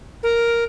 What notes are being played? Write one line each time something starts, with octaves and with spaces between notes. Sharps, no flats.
A#4